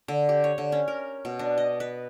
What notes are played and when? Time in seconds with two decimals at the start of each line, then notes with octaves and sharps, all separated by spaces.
0.08 D3
0.29 G4
0.44 C#5
0.58 D3
0.72 C#4
0.88 A#4
1.25 B2
1.39 D4
1.58 D#5
1.80 B4